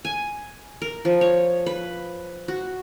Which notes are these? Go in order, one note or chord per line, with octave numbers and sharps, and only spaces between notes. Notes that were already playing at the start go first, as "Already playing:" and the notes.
G#5
A#4
F3
C#5
B4
F#4